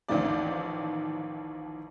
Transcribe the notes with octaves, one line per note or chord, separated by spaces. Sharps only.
A1 D#2 D#3 F3 D5